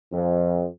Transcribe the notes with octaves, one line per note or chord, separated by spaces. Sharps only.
F2